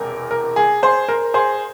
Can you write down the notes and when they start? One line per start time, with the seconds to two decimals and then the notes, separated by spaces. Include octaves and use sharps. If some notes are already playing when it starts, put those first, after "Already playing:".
Already playing: E1 E2 C3 A#4
0.31 A#4
0.56 G#4
0.83 G#4 C5
1.08 A#4
1.34 G#4 C5